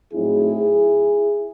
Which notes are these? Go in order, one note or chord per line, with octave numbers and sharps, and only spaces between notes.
A2 F#3 A3 C4 D#4 E4 G#4